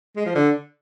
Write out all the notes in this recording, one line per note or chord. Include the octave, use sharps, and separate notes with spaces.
G#3
F3
D3